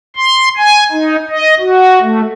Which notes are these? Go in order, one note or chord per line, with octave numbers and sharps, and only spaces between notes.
C6
G#5
D#4
D#5
F#4
A3